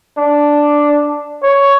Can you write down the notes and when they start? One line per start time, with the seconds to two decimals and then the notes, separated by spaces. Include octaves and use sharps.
0.18 D4
1.43 C#5